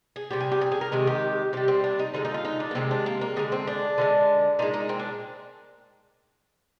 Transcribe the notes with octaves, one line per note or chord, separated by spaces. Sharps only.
G#4
C3 G3 G4
G#4
G4
G#4
G#4
A#4
C3 D#3 G#3 G#4
G4
C3 G3 G4
C4
D4
D#4
D3 F3 G#3 D#4
D#4
F4
D#4
D4
A#3
C3 D#3 G#3 C4
D4
A#3
A#3
D3 G#3 G#4
C4
D4
D3 F3 G#3
A#2 G#3 D#4
D#4
C4
D4